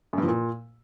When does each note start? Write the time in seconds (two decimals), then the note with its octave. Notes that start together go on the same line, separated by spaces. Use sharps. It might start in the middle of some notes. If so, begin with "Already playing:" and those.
0.13 F#2
0.18 G2
0.23 F3
0.28 A#2